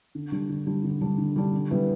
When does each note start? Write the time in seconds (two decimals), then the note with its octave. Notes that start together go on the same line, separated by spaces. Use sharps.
0.15 D3
0.32 G3 D4
0.49 D3
0.67 G3 D4
0.84 D3
1.01 G3 D4
1.18 D3
1.36 G3 D4
1.53 D3
1.71 G3 B3 E4